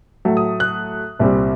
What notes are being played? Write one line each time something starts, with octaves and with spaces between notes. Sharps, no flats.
A2 F#3 A3
D#6
F#6
C2 A#2 G3 C4